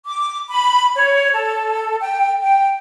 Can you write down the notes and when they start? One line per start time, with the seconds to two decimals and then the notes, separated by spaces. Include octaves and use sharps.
0.05 D6
0.50 B5
0.96 C#5
1.33 A4
2.01 G5
2.41 G5